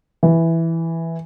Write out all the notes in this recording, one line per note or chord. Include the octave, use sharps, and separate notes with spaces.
E3